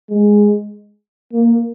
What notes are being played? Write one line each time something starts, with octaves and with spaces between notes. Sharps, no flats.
G#3
A#3